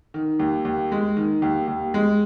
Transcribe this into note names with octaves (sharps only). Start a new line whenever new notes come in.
D#3
D#2
D#2
G#3
D#3
D#2
D#2
G#3